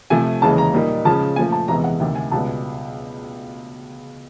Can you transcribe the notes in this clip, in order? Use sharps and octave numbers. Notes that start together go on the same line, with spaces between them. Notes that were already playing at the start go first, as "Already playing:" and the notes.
C3 F3 A3 G#5
D#2 C#3 E3 G#3 A5
A#5
A#2 G3 A#3 D#4
C#3 F3 G#3 C#4 A5
A#2 F3 A3 G#5
A5
E2 C3 E3 G#3 B3 A#5
F#5
D2 C3 D#3 G5
G#5
C#2 B2 G3 B3 A5